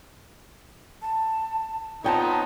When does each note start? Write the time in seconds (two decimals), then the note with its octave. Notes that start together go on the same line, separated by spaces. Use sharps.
1.02 A5
2.04 B3 C4 D#4 F4 C#5 G5 A5